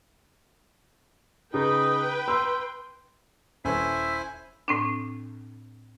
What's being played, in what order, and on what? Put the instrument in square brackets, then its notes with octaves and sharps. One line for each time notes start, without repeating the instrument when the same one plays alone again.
[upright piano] C#3 [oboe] D#4 [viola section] B4 G5
[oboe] C6 [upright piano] E6
[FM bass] D#1 [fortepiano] C#4 A4 B4 [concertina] E4 C5 G#5 [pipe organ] E5
[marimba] A2 C4 D4